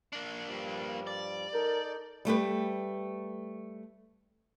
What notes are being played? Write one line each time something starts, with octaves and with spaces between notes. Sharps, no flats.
A#3 D4
G2 F3 G3
D5
D#4 A4 A#4 G6
G3 A3 G4 B4